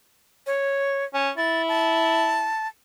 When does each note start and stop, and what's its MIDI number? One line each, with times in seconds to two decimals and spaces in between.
0.46 1.05 73
1.14 1.30 61
1.37 2.51 64
1.37 1.62 93
1.68 2.68 81